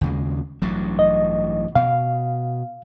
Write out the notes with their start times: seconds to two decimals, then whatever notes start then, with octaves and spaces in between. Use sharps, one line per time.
0.01 D#2 C#3 G#3
0.62 A1 G2 F#3
0.99 D#5
1.75 B2 F5